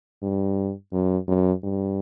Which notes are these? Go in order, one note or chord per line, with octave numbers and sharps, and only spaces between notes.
G2
F#2
F#2
G2